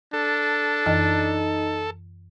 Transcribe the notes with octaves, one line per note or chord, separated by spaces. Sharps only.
D4 A4
F#2 E3 D#4 D#5